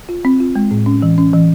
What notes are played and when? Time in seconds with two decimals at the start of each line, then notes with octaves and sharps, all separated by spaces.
0.09 F4
0.25 C4
0.40 F4
0.55 G#3
0.71 A2
0.86 C#4
1.02 E3
1.18 C#4
1.33 E3